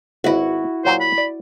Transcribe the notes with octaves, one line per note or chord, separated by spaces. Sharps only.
G#1 E4 F#4 B4
A#2 F#3 C5 A#5
B5
D5